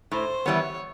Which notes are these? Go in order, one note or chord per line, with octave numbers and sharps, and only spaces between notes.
A2 C5
E3 G3 B3 C#5